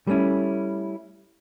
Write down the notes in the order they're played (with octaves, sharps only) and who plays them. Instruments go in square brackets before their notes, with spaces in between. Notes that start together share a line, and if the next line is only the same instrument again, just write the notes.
[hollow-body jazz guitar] G3 A3 C4 C#4 E4